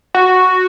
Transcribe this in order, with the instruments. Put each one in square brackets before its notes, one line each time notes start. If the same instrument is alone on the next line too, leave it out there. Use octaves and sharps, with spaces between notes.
[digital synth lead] F#4